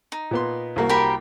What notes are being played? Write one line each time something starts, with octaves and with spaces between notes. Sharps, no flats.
D#4
A#2 B3 C6
C2 A#3 F#4
G4 A#4 B5